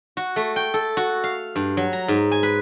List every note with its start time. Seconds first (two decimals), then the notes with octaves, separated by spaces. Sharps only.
0.17 F#4
0.36 A3
0.56 G5
0.74 A4
0.97 F#4
1.24 F5
1.56 G2
1.77 F#3
1.93 A#5
2.08 G#2
2.31 G#5
2.43 B4